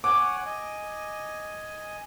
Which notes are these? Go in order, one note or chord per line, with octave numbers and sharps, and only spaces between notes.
C#5 F#5 G#5 D6
D#5 G#5